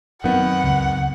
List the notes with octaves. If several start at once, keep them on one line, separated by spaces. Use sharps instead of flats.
F#2 D#3 F#3 B3 C4 F#5
C#2